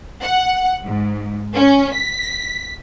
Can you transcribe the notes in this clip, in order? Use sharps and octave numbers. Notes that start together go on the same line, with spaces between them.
F#5
G#2
C#4
B6